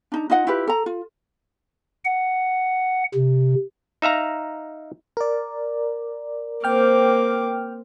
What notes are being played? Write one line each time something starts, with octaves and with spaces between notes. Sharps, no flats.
D4 D#4 A#5
D#4 F4 D#5 F#5
E4 F4 G4 B4
A4 A#5
F4
F#5
C3
D#4 E5 F5 A#5
A#4 D5
A#3 C4 G5 D6 F6